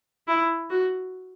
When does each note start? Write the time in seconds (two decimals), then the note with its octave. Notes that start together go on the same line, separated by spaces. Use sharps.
0.28 E4
0.70 F#4